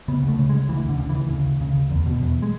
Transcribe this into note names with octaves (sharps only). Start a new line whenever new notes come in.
C#3 B3
D2
A3
C#3
G#3
C#3
D2 E3
D2
D3
C#3
E3
D2
C#3
D2
C#3
D2
E2
B2
E2
G#3